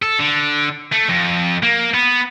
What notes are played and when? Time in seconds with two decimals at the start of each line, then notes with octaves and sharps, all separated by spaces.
0.02 A4
0.19 D3
0.93 A3
1.09 F2
1.63 A#3
1.94 B3